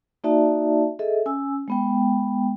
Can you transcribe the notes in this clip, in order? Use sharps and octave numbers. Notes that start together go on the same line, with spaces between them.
A#3 D#4 F#4 D5 E5 A5
G#4 A4 D#5 E5
C#4 G#5 E6
G#3 B3 G5